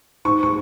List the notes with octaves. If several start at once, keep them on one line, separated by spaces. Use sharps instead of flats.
G#2 C#6
C#6